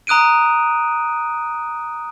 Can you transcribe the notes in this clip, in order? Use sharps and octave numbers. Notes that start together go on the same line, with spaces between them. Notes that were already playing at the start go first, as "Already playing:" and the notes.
A#5 D#6 F#6 D7 D#7